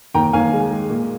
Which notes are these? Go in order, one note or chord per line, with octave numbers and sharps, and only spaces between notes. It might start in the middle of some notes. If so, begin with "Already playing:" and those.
D#2 G5 A#5
D#2 F5 G#5
G#3
G#3
A#2